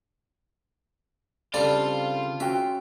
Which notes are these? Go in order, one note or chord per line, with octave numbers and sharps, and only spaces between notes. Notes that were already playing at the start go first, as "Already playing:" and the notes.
C#3 G3 C4 D4 F4 A4 D5
C#4 F#4 E5 G5